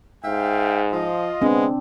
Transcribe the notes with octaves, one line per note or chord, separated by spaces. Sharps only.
G#2 E5 F5 G5
F3 F4 D#5
G#3 B3 C4 D4